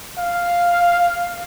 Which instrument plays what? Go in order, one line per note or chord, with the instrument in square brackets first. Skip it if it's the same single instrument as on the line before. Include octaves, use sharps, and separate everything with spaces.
[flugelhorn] F5